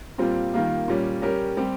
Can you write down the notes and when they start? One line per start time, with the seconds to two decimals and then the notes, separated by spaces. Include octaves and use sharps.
0.18 A#2 G3 C4 F4
0.54 D#3 G3 A#3 F4
0.88 A#2 G3 C#4
1.22 G3 C#4 G4 A#4
1.57 G3 C4 G4